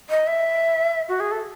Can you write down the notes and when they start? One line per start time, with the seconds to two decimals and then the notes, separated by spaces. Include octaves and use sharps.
0.10 D#5
0.27 E5
1.09 F#4
1.20 G#4
1.32 A4